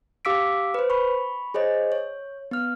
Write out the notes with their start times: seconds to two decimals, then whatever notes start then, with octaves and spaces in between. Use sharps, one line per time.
0.25 G4 F5 D6 E6 B6 D7
0.74 B4 C5
0.90 B5 C#6
1.54 G#4 C5 C#5 D#5
1.92 C#5
2.51 B3 F6